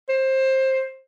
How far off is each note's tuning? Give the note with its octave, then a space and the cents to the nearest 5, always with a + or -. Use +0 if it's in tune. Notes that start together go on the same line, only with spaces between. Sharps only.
C5 +20